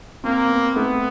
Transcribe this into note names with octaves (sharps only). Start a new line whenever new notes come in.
A#3 C4
B3
A3 B3